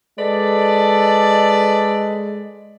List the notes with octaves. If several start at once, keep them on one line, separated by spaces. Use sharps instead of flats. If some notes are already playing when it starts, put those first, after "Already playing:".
G#3 A4 B4 D5